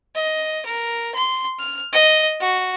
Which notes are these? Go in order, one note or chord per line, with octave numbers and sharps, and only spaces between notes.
D#5
A#4
C6
F6
D#5
F#4